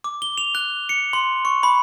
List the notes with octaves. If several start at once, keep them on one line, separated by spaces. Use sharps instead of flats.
D6
G7
F7
F#6
C#7
C6
C#6
B5